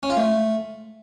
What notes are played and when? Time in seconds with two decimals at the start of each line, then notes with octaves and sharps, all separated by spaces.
0.03 C#4
0.10 F4
0.17 A3